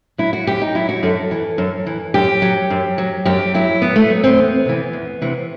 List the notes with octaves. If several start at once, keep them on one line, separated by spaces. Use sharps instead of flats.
F#3 E4
F#4
F#2 G4
D#4
F#3 E4
F#4
F#2 A4
E3
F#2
E3
F#2 G4
F#3
F#2
F#3
F#2 G4
F#3 E4
F#2 B3
A3
F#3
C4
E2 B3
C3 E3
E2
C3 E3